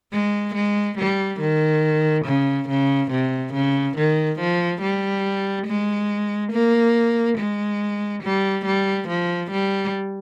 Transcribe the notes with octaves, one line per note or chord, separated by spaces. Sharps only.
G#3
G#3
G3
D#3
C#3
C#3
C3
C#3
D#3
F3
G3
G#3
A#3
G#3
G3
G3
F3
G3